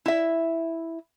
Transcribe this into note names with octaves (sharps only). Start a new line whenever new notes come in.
E4 E5